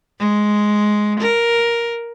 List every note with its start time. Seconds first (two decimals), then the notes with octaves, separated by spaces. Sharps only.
0.19 G#3
1.20 A#4